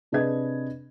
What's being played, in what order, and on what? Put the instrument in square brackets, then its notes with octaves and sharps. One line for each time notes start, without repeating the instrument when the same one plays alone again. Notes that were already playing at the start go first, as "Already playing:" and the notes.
[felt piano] C3 D4 G#4 B4 D#5 G#6